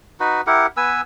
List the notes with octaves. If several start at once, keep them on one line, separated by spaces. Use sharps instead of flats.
D#4 F#4 B4
E4 G4 A#4 F#5
B3 B4 G#5 E6